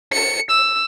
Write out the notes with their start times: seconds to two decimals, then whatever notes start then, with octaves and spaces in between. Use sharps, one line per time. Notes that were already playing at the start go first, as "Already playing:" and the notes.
0.13 C#7
0.50 E6